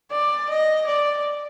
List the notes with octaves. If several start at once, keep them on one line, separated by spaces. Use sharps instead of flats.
D5
D#5
D5